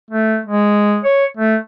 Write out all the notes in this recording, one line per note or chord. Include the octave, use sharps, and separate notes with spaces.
A3
G#3
C#5
A3